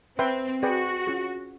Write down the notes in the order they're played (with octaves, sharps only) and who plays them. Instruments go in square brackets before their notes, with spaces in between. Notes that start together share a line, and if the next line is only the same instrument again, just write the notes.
[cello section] C4 [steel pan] B4 E5 G5 C6
[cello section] F#4 [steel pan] G#4 B4 D5 G5
[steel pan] C#4 F4 G#4